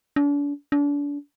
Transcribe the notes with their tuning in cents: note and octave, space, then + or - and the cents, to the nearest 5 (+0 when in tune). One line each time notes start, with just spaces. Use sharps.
D4 -40
D4 -35